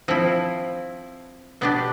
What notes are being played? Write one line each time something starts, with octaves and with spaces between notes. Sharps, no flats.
F3 C4 E4
B2 B3 D4 G4